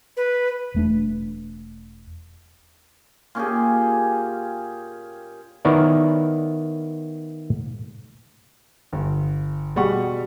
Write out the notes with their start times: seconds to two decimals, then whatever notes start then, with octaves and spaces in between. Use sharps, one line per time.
0.17 B4
0.74 E1 A3 D4
3.35 A#2 C#4 G4 G#4
5.65 D#3 B3 E4 A#4 C#5 D5
8.93 G1
9.76 B2 G3 G#4 F#5 C#6